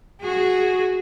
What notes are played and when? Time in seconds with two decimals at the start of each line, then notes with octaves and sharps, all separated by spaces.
0.21 F#4 G#4